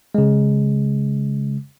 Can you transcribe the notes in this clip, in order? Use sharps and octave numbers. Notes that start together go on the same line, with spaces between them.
C#3 G#3